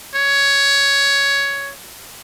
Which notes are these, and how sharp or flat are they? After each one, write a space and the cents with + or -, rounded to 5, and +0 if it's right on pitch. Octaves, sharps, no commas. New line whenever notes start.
C#5 +10